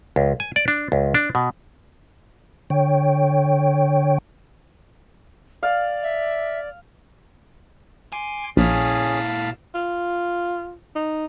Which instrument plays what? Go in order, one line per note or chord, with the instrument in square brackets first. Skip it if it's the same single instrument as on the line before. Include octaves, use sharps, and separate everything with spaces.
[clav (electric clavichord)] C#2
G#5
D5
D4
C#2
D4
B2
[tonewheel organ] D3 C#5 G5
[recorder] D5 [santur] F5
[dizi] E5
[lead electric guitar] G#5 [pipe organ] C6 D6
[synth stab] A#1 [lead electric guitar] A#2 E4 [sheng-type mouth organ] C#4 G#4 [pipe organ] F5 A5 B5
[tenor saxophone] F4
D#4